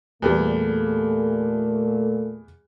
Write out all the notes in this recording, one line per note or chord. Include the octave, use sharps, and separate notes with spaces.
E2 A#2 G3 A3